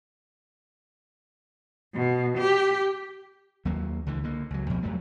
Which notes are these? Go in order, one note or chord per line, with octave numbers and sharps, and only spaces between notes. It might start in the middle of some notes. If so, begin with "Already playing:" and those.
B2
G4
D#2 F#3 A#3
C#2 D3 E3
D3 A#3
C#2 F#3
F2 B2 F3
F2 F#3 G3 A3